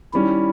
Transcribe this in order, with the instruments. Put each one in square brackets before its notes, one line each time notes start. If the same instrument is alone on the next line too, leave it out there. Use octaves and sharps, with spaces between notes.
[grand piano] D#3 G3 C#4 [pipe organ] E4